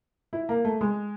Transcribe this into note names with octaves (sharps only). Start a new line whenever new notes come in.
E4
A#3
A3
G#3